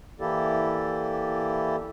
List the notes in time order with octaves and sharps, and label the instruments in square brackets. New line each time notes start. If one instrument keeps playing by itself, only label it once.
[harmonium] E3 A#3 E4 G4 A4 D5